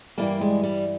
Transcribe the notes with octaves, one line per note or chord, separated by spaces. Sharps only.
G2 E3 G3 A#3
G#3
G3